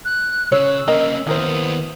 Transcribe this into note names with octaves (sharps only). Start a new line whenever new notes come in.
F#6
C#3 C#5 E6
A#3 C#4 A#4 D#5
D#2 B3 E4 A#4 C5 D#6